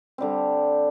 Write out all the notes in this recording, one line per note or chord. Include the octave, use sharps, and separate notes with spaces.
D3 G3 C4